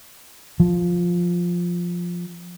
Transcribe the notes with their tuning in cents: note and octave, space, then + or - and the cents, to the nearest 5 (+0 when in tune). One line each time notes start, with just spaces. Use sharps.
F3 +5